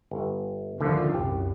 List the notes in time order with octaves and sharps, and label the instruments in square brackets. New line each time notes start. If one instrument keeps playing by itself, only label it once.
[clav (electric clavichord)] G1
[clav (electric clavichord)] D2 D3 [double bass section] D#3 F3
[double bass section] C2 F#2 [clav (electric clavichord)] G4